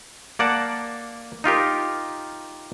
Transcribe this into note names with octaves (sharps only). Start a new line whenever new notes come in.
A#3 D5 F#5 A5
D#4 F4 G4 A#4